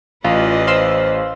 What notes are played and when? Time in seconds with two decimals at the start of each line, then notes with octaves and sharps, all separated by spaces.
0.24 A1 F4 B4 D5 D#5
0.67 C5 F5 C6 E6